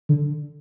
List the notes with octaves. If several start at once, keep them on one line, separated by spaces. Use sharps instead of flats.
D3